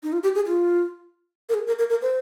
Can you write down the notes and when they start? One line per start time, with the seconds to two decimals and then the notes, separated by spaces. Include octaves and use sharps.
0.03 D#4
0.13 F4
0.23 G4
0.35 G#4
0.47 F4
1.49 A#4
1.54 G#4
1.67 A#4
1.79 A#4
1.90 A#4
2.02 C5